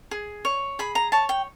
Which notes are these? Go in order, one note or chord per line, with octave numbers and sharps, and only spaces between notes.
G#4
C#5
G#4 B5
A#5
C#5 A5
G5